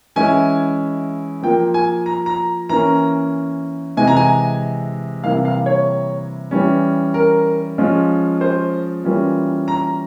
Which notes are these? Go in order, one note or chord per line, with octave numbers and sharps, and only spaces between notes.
E3 G#3 C#4 E4 G#5
F3 A#3 F4 G5
G#5
A#5
A#5
E3 A#3 C#4 A#5
C3 E3 G#3 G#5
A#5
G#5
C3 E3 G3 A#3 E4 F5
F5
C#5
E3 G3 C#4
A#4
F3 G#3 C#4 F4
C5
E3 G3 A#3 C#4 F4
A#5